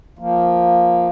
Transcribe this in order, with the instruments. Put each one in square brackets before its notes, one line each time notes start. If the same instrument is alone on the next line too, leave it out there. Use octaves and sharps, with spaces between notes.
[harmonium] F3 A#3